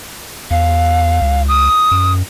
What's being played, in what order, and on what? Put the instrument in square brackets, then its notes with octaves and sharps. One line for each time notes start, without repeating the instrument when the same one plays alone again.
[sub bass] E2 [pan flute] F5
[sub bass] C#2
[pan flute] D#6
[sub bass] F#2